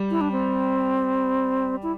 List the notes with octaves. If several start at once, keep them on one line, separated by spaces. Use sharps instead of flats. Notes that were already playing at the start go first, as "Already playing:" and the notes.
Already playing: G3
E4
D4
C4
E4